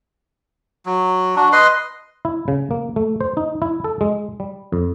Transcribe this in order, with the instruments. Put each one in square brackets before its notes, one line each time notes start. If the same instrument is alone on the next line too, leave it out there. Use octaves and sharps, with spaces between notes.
[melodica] F#3
D4 F#4
B4 D#5 C6
[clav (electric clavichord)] E4
C#3
A#3
A3
C5
D#4
E4
A4
G#3
G3
F2